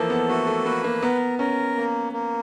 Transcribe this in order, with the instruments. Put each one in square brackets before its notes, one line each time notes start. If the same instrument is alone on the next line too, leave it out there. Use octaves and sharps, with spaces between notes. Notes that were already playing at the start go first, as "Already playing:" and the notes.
Already playing: [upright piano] E3 F3 A#3 [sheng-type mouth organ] A4
[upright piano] B3
[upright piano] A3 [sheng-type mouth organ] F#4
[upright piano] A3
[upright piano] A#3 [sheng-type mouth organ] B4
[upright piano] A#3
[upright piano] B3 [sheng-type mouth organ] A#4
[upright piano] C#4 [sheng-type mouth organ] A#4
[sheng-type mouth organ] A#3
A#3